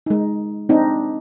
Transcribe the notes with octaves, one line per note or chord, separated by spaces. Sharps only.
G#3 D#4
C4 D4 D#4